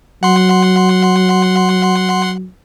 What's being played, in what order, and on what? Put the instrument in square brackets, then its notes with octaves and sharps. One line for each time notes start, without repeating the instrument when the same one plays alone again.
[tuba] F#3 [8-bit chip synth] F#5 C6